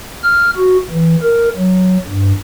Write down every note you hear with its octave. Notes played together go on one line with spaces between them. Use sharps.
F6
F#4
E3
A#4
F#3
G2